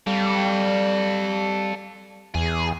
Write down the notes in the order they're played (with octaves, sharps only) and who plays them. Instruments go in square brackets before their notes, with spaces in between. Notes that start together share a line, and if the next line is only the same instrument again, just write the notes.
[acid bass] G3 [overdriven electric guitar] A4 F5
[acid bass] E2 [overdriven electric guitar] G#4